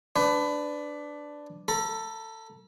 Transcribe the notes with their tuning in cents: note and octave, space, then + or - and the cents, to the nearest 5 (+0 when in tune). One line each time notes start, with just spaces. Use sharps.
D4 +0 B4 +25
A4 +20 B5 -45